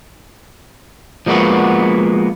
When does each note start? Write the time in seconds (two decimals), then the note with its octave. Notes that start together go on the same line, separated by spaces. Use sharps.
1.26 F3 G#3 A#3 B3 F#4